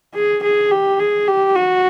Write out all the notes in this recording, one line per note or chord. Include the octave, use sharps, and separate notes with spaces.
G#4
G#4
G4
G#4
G4
F#4